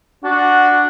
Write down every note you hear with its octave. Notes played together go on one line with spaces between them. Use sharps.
D4 F#4